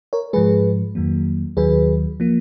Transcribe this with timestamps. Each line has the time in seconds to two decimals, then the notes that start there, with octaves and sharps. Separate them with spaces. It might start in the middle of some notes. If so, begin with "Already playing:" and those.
0.13 A#4 C#5
0.33 G#2 F3 G#3 G#4 B4
0.95 F2 D#3 F#3 A#3
1.57 D#2 D#3 F#3 G#4 B4
2.20 F3 A#3